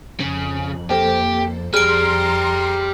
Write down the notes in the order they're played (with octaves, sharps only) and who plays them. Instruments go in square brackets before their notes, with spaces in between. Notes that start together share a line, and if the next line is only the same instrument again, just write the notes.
[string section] F2 [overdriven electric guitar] C#3 [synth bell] F#7
[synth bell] A#3 A4 C5 [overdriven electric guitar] G4
[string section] F2 A#5 C6 [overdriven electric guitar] G3 [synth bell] G#4 [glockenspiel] F6 D7